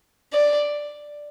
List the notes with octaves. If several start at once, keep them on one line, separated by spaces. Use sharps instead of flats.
D5